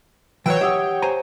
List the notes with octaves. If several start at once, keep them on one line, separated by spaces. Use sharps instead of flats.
E3 F#3 C#5 G5
G4 E5 F#5 D#6
C5 G#5 A#5